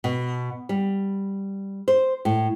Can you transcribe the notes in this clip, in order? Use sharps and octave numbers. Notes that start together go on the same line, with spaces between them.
B2
G3
C5
A2